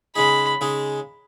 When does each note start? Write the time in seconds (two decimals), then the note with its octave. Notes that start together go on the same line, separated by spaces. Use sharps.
0.16 C#3 G#3 D#4 G#4 B5
0.61 C#3 G#3 D#4 G#4